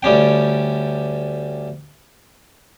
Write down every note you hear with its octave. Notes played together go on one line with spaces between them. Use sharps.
D2 G3 C#4 G5